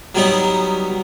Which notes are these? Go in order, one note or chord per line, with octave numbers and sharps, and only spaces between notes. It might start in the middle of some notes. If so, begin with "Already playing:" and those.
F#3 G3 B3 D#4 C#5